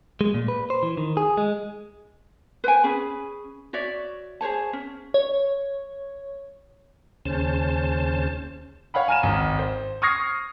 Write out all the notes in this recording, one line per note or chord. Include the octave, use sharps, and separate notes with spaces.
G#3
A#2
B4
C5
E3
D#3
G#4
G#3
B4 C5 G5 G#5
C#4 G#4 B5
F#4 C#5 D5 E5
G#4 C5 C#5 A5
C#4
C#5
D#2 C#3 C#4 C5 A5
C#5 F5 F#5 B5
G#5 A#5 F6 D#7 E7
G#1 C#2
C5
C#6 D#6 F6 G#6 A#6 C7